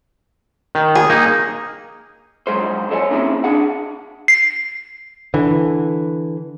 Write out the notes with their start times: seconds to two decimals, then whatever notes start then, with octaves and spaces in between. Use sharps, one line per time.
0.75 D#3
0.95 G#4
1.10 A#3 D#4
2.47 F2 G#2 F#3 G#3 G#4 C5
2.91 A4 C5 C#5 D#5 F5 G#5
3.10 A#3 C4 C#4 D#4 E4 G#4
3.44 D4 G#4 F#5
4.28 C7
5.34 D3 E3